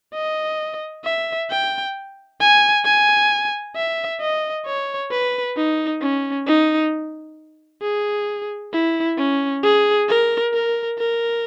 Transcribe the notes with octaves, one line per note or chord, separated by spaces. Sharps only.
D#5
E5
G5
G#5
G#5
E5
D#5
C#5
B4
D#4
C#4
D#4
G#4
E4
C#4
G#4
A#4
A#4
A#4